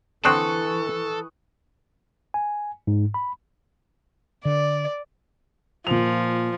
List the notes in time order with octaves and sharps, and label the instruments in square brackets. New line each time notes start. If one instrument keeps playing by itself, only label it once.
[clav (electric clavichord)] D3 C4 D4 [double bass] E3 [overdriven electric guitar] A4 [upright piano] C#6 D#6 F#6
[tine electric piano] G#5
G#2
B5
[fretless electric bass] D3 [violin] D5
[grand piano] A#2 F7 [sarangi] F3